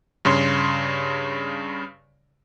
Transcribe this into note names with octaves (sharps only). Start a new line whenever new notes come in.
G2 C#3 C#5 C6